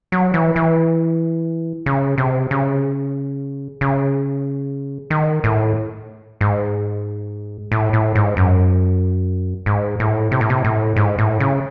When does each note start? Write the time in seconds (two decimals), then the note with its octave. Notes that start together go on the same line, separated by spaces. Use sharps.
0.12 F#3
0.34 E3
0.56 E3
1.86 C#3
2.18 C3
2.51 C#3
3.81 C#3
5.10 D#3
5.44 A2
6.41 G#2
7.72 A2
7.93 A2
8.15 G#2
8.37 F#2
9.66 G#2
10.00 A2
10.32 C3
10.41 A2
10.50 C3
10.64 A2
10.96 G#2
11.18 A2
11.40 C#3